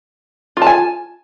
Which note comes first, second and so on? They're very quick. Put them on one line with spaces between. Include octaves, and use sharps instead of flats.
F4 A5 G#5